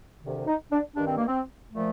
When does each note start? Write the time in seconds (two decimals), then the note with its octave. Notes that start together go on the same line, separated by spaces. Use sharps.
0.22 D2 C3 D#3
0.47 D#4
0.72 D4
0.97 G2 D#3 D4
1.07 C4
1.18 A#3
1.28 C4
1.72 A#2 F3 A3